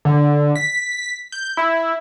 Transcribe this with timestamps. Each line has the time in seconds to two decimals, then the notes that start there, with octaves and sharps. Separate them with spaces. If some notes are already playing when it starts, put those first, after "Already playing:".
0.05 D3
0.56 B6
1.32 G6
1.57 E4